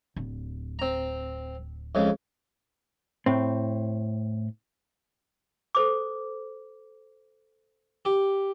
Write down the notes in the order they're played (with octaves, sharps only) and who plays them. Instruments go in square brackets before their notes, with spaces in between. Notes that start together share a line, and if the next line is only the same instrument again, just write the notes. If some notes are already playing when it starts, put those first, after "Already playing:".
[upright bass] D1
[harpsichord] C4 A#5
F2 C#3 G#3
[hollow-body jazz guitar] A2 C4
[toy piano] A4 C5 D6
[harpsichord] G4